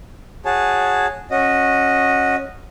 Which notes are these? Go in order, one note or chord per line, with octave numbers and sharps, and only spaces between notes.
F#4 G#4 C#5 A5
C#4 F#4 D#5